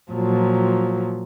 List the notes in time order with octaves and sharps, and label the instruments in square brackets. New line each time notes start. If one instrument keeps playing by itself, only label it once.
[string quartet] A#2 F3 F#3